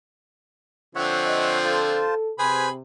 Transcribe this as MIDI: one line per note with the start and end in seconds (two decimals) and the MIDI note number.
0.95 2.04 50
0.95 2.04 53
0.95 2.04 60
0.95 1.58 73
0.95 1.58 76
0.95 1.58 78
1.25 1.51 75
1.64 2.14 65
1.64 2.30 69
1.64 2.14 72
1.64 2.14 81
2.39 2.82 48
2.39 2.68 68
2.39 2.69 71
2.39 2.69 72
2.39 2.69 80
2.39 2.68 83